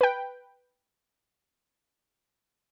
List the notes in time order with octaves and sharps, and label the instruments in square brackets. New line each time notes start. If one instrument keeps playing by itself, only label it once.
[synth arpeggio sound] B4 G5